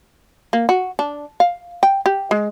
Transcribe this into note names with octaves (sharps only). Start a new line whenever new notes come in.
A#3
F#4
D4
F5
G5
G4
G#3